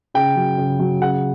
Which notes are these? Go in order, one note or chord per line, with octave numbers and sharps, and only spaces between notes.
C#3 G5
F#3
C#3
F#3
C#3 F#5